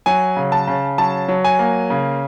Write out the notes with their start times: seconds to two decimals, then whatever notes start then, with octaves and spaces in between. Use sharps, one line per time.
0.06 F#3 G#5
0.37 C#3
0.52 A5
0.67 C#3
0.98 F#3 A5
1.28 F#3
1.44 G#5
1.59 A#3
1.90 C#3